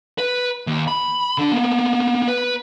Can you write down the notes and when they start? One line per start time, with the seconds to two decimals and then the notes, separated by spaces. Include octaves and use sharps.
0.18 B4
0.67 D#2
0.88 B5
1.38 D3 D4
1.52 A#3 B3
2.28 B4